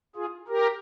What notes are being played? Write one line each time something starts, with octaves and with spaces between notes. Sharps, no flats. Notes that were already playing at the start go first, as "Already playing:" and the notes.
F4 G#4
G4 A#4